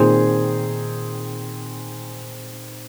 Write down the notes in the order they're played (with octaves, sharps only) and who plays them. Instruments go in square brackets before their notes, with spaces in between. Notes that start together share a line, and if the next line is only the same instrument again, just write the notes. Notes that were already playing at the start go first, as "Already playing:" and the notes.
Already playing: [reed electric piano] A#2 [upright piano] D#3 C4 G#4 C5